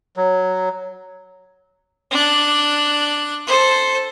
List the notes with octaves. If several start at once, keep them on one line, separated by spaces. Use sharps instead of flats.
F#3
D4 F#6
A4 C5